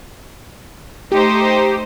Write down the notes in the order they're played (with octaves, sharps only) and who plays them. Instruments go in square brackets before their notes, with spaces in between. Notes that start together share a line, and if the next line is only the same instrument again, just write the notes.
[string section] A3 D#4 C5 [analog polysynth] G4